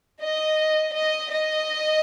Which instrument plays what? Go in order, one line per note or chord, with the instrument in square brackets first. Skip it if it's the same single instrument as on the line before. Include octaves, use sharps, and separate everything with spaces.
[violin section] D#5
D#5
D#5